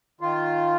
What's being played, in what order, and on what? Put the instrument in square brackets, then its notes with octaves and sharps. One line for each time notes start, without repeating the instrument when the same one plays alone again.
[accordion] D#3 F4